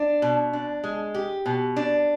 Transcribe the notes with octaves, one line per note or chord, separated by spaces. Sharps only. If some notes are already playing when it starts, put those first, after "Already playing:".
Already playing: D4
B2
D4
G#3
G4
B2
D4